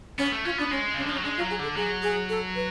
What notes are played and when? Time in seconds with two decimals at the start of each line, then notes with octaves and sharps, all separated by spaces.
0.18 B3 C#4
0.32 A3
0.45 C#4 F4
0.58 B3 D4
0.71 G#3 C#4
0.94 C#3
0.97 C#4
1.01 D3
1.06 D4
1.09 F3
1.13 C#4
1.17 F#3
1.23 G#3 D4
1.37 F4
1.41 F#3
1.50 G#4
1.59 D3 A4
1.76 F#3 G#4
2.03 G#4
2.29 A4
2.55 B4